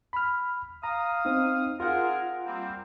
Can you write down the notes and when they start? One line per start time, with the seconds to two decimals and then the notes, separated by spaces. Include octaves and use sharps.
0.13 B5 F6
0.84 F5 A#5 D#6
1.25 C4 D#4
1.80 C4 F4 G#4 A#4 F#5
2.46 G3 A#3 C4